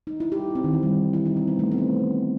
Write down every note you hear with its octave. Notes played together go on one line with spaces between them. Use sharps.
D#4
E4
G4
C4
D#3
E3
G3
E4
D#4
C4
B3
A3
C4
B3